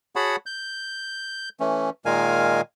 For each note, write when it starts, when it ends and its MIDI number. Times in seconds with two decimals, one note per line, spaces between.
0.16 0.36 66
0.16 0.36 68
0.16 0.36 73
0.16 0.36 78
0.16 0.36 81
0.16 0.36 83
0.46 1.49 91
1.60 1.90 52
1.60 1.90 57
1.60 1.90 61
2.06 2.61 46
2.06 2.61 51
2.06 2.61 56
2.06 2.61 70
2.06 2.61 77
2.06 2.61 80